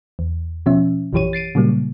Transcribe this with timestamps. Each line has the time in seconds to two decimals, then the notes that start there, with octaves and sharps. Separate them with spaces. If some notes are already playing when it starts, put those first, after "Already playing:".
0.19 E2
0.66 B2 F3 C#4 E5
1.13 A#1 F#2 E3 G4 C#5 D#7
1.33 A6 C7 D7 D#7
1.55 A#2 C#3 F#3 G3 A#3